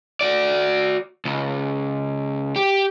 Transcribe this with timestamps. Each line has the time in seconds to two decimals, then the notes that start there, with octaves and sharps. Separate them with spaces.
0.21 F#4 D5
1.25 C#2
2.56 G4